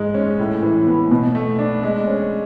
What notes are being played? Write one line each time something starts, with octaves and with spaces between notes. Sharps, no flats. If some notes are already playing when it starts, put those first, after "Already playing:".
Already playing: G#2 G#3
C#4
A2
E3
B3
B2
A3
D4
G#3
C#4